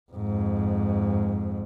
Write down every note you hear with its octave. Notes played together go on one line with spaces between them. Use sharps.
F2 G#2